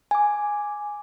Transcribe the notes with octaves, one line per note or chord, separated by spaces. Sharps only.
G#5 D6